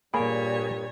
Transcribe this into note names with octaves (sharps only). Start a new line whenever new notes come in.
G2 A#2 G3 A#3 G#4 C#5 G#5 B5